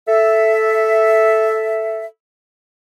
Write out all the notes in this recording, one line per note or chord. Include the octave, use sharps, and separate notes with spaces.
A4 E5